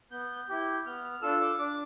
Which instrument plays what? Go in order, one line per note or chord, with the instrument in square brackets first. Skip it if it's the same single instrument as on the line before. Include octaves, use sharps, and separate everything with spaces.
[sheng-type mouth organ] B3 G6
G6
E4 G4
G6
B3 F6
F6
D4 F4 A4 E6
D6
D4 D6